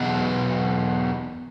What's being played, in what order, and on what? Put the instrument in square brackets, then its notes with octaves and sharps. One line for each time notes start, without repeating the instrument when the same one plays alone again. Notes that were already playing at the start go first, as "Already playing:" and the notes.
Already playing: [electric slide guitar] E2 B2 F#3 B3 F#4